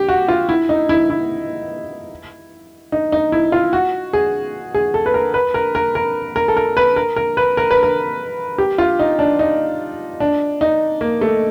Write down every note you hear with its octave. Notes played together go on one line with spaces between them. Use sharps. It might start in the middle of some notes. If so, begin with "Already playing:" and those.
Already playing: G4
F#4
F4
E4
D#4
E4
E4
D#4
D#4
E4
F4
F#4
G#4
G#4
A4
B4
A#4
B4
A#4
A#4
A#4
A#4
A4
A#4
B4
A#4
A#4
B4
A#4
B4
A#4
G4
F4
D#4
D4
D#4
D4
D#4
A#3
A3